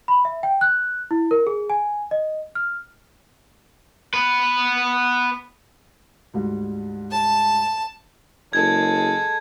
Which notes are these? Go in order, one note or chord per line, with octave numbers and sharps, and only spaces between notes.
B5
E5
G5
F#6
E4
A#4
G#4
G#5
D#5
F6
B3 B4
D2 G#2 G3
A5
F#1 G#3 A4 G#6